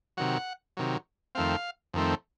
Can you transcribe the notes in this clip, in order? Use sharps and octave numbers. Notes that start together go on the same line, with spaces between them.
C3 D#3 F#3 F#5
C3 D#3 F#3
F2 D#3 A3 C4 F5
F2 D#3 A3 C4